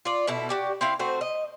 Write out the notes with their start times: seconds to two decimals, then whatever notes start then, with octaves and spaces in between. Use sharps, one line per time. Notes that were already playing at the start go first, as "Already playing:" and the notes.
0.05 F4 D5
0.27 B2 E4 A4
0.49 F#4 G4 D5
0.81 C4 E4 F5
0.99 A3 C4 F#4 C5
1.21 D#5